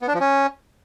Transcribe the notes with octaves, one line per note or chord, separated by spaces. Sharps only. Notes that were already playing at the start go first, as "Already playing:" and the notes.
B3
D4
F3
C#4